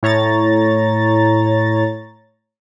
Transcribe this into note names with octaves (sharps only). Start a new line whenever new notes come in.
A2 C#5 A#5 A6